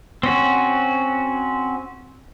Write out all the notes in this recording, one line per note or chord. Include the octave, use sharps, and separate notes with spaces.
C4 C#4 F#4